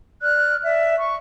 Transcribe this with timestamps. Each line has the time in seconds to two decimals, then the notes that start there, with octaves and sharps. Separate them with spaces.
0.23 D5 F6 F#6
0.64 D5 E5
0.98 C#6